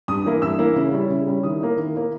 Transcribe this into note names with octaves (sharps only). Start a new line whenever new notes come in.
G2 D#6
E3 A#3 E4
G2 E6
E3 A#3 E4
C#3
G3 C#4 E4
C#3
G3 C#4 E4
D#3 D#6
A#3 E4
D#3
A#3 E4